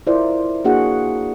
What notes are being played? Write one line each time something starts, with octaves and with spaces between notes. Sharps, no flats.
E4 F4 A#4 C5 D5
A#3 D4 F#4 G#4 F#5